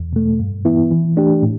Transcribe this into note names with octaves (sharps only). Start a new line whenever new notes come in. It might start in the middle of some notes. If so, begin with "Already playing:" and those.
Already playing: E2
B2 A3
G2
E3 B3 E4
E3
A3 D4 G4
A2